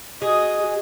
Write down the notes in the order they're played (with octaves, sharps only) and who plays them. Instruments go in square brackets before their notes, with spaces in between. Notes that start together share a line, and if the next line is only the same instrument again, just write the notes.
[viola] F#4 D#5 [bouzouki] G#4